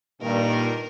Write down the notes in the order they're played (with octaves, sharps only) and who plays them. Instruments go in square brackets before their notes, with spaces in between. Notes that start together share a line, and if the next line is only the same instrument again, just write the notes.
[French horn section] G2 D#3 [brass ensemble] A#2 [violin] A#4